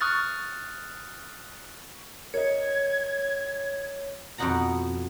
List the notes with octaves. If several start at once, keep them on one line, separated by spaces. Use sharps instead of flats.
C#6 D#6 F6 F#6 A6
A#4 C#5 D#5 G#6
F2 B2 B3 D#4 F#5 A#5